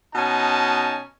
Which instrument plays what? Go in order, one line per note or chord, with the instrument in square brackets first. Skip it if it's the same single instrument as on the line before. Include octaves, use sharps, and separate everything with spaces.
[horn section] B2 C#4 D#4 A5